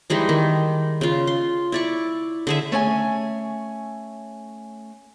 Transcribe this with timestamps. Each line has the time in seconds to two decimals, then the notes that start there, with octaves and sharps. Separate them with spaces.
0.10 E3 G3 G#3 D#4
0.29 D#3
1.01 C#3 F4
1.27 C6
1.72 E4 D5 C#6
2.47 D3 G#4 E5
2.72 A3 C#4 G#5